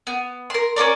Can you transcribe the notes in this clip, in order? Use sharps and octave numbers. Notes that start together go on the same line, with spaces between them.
B3
A#4 C6
C#4 F4 A#4 D5